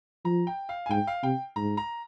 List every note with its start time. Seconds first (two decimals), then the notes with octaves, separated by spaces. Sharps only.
0.25 F3 A#5
0.47 G5
0.69 F5
0.86 G#5
0.90 G#2 G5
1.07 F5
1.23 C3 G5
1.56 G#2 A#5
1.77 A#5